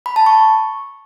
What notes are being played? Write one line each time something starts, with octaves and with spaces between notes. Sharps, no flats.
B5
A5
C#6